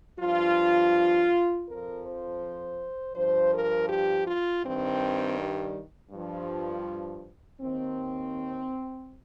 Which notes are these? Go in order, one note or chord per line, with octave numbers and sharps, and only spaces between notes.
G2 F3 F4
F2 F3 A#4
C5
G2 F3 C5
A#4
G4
F4
G2 D#3 C4
G3
G2 F3
D#2 D#3 C4